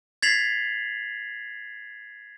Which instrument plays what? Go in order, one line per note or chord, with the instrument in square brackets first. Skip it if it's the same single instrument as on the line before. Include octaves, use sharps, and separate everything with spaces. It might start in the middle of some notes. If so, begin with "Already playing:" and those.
[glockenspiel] G#6 A6 B6 C7 F7 F#7